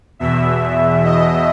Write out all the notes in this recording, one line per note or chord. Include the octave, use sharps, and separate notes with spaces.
E2 B2 E5
D#5